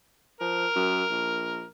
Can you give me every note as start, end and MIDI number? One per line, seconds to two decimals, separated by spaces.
0.41 0.67 53
0.41 1.67 70
0.76 1.04 42
1.11 1.64 34